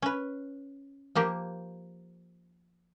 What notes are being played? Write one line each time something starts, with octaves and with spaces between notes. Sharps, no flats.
C#4 B4
F3 A#3 G4